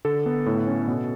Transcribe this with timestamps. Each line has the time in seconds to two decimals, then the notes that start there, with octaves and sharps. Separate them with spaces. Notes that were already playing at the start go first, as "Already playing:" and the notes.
0.05 D3 A4
0.26 B3
0.46 A2
0.67 C#4
0.88 B2